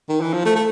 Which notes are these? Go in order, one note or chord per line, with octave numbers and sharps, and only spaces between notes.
D#3
E3
F3
A3
A3